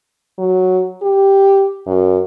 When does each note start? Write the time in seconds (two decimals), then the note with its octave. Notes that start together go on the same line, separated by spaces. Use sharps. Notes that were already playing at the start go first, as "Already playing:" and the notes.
0.38 F#3
1.02 G4
1.86 F#2